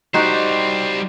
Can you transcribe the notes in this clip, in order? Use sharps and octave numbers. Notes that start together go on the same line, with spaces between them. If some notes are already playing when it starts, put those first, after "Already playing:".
G3 D#4 F#4 G4 C5